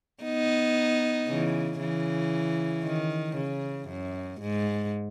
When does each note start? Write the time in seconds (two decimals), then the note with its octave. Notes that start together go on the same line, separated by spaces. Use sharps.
0.23 B3 D#4
1.28 C#3 E3
1.80 C#3 E3
2.84 D#3
3.36 C#3
3.88 F#2
4.40 G#2